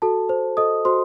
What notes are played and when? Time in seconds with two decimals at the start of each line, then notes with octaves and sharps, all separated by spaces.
0.02 F#4 A4 A5
0.29 C5
0.57 A4 D#5 D#6
0.85 F#4 C5 C6